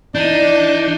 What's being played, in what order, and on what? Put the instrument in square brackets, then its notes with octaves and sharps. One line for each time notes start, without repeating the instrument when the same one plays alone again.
[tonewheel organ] E3 G6 [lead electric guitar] D4 [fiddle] D#4 [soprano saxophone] D5